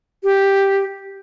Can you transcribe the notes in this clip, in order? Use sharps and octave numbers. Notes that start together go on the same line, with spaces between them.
G4